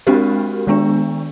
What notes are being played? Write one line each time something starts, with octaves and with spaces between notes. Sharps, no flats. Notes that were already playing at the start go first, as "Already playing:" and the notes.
G#3 C4 D4 F#4 G4 A#4
D#3 G#3 B3 D4